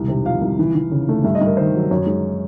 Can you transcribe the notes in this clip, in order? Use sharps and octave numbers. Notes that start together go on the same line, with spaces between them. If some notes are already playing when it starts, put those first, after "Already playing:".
Already playing: E1 C2
C3
F3 F5
C2
E3
E3
C#3
A3
G2 E5
D#5
G2
A#4
D#3 C5
F#3
F#2 C#5
G#3